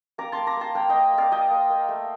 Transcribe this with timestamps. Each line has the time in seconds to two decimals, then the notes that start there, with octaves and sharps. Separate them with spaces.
0.18 A#3 A#5 D6
0.32 A#3 A5 C6
0.47 A#5 D6
0.57 A#3 A5 C6
0.75 A#3 G5 A#5
0.89 A#3 D#5 G5
1.14 A#3 D5 F5
1.32 F4 D#5 G5
1.51 A#3
1.70 A#3
1.89 A3